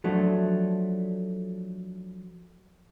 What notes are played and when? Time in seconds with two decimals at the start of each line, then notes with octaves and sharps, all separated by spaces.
0.04 F3 F#3 A3 D4